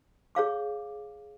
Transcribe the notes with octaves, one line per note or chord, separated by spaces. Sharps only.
G#4 C#5 F5 D6